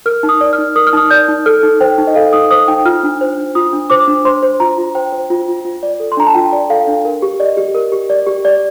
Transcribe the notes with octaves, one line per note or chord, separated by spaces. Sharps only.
A#4 F6
D#4
D#6
D5
F6
D#4
A#4 D#6
F6
D#4 D#6
D5 G6
D#4
A4 F6
D#4
C5 G5
D#4
D#5
A4 F5
D#4 D#6
C5 D#6
D#4 G5
F4 F6
D4
C5
D4
F4 D#6
D4
C5 D6
D4
C5 C6
C5
F4 A#5
F4
C5 G5
C5
F4
F4
F4
D5
A4
C6
D4 A#5
A5
F4 G5
D5
A4 F5
D4
A#4
G4
D5 D#5
G4
A#4
G4
D5
G4
D5